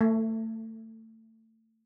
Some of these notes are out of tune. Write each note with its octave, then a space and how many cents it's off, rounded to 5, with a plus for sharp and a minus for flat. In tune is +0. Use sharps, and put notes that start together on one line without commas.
A3 +25